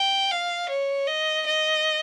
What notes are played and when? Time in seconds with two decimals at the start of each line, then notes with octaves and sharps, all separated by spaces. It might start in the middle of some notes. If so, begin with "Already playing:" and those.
Already playing: G5
0.31 F5
0.69 C#5
1.08 D#5
1.46 D#5